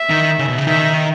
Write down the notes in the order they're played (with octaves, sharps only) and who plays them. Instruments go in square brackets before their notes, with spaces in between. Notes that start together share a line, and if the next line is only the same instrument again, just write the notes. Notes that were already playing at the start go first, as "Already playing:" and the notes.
Already playing: [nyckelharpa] E5
[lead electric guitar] D#3
C#3
B2
C#3
[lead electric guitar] D#3 [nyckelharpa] E5